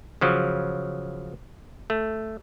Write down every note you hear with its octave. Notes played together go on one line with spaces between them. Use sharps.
C#3 F3 F#3
A3